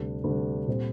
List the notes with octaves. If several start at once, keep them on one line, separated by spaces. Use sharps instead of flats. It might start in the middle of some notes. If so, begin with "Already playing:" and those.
Already playing: D2 C3 G3 D4
D2 C3 G3 D4
A#2 G3 C4